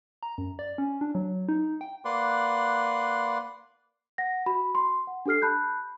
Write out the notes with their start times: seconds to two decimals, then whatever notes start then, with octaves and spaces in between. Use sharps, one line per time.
0.23 A#5
0.38 F#2
0.59 D5
0.78 C#4
1.01 D4
1.15 F#3
1.49 D#4
1.81 G5
2.05 A#3 B4 D5 F#5 C6
4.18 F#5 A#6
4.46 F#4 B5
4.75 C6
5.07 F#5
5.26 D4 G4 A4 F6 C7
5.42 A5 B5 F#6 G6